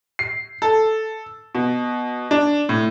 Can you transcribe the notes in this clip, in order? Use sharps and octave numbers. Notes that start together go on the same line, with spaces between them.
C7
A4
B2
D4
A2